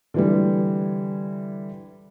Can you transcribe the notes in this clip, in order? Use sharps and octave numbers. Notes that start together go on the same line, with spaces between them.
D3 E3 G3